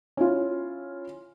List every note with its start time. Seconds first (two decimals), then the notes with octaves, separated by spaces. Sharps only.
0.17 C#4 E4 F4